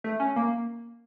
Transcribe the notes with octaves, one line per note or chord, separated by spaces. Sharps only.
A3
C#4
A#3